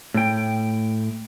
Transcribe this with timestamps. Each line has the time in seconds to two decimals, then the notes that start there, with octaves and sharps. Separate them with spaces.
0.14 A2 G5